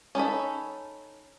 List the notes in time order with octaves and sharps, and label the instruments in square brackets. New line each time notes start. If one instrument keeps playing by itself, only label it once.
[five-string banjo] C#4 D#4 A4 B5